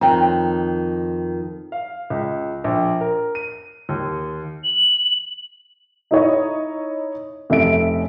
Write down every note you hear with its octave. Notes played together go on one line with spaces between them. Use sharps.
F2 D#3 C#5 G5 A#5
F5
C#2
A#1
A#4
D#7
D#2
F#7
D#4 E4 C#5 D#5
F1 C#4 E5 D7